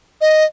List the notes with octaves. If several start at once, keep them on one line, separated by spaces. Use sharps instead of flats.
D#5